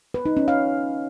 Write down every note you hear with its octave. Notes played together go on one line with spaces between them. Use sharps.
B4
D#4
C#4
F5